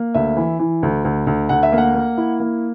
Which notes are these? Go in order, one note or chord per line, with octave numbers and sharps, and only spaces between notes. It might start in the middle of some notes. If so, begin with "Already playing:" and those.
Already playing: A#3
D2 E5
E3
E3
D2
D2
D2
D2 F#5
E5
A#3
F#5
A#3
E4
A#3